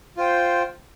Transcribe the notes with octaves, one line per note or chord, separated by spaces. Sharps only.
F4 C5 G5